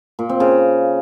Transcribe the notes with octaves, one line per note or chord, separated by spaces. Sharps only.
A#2
C4
C#3